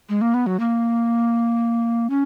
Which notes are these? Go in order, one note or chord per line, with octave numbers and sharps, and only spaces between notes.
G#3
A#3
B3
F#3
A#3
C#4